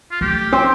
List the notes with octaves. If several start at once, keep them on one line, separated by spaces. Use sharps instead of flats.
F4
A3 G4
C4